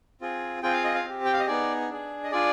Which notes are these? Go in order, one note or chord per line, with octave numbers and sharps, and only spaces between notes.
C4 F4 G#4
C4 F4 G#4 G5
F5
D#5
F5
C4 G4
G5
F5
D#5
B3 D#4 G#4 D5
D4 G#4
D#5
D4 F4 G#4 D5